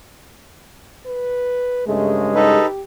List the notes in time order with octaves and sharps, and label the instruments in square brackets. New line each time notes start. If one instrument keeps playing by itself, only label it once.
[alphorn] B4
[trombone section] G2 C#3 G#3 [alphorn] A3
[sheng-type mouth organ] D#4 A4 B4 [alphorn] G4